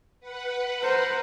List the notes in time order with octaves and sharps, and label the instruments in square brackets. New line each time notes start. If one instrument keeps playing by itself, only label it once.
[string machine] B4 F#5
[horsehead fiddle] A#4 C5